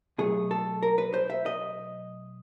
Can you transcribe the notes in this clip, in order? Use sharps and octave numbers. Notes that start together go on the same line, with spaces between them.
B2 F#3 A3 G#4
A4
A#4
B4
C5
E5
D#5